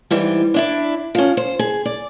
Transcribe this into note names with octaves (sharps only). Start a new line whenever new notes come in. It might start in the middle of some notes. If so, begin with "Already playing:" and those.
G#2 E3 G3
D4 E4 D5
F3 C#4
C5
G#4
D5